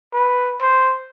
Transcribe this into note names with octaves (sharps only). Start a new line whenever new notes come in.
B4
C5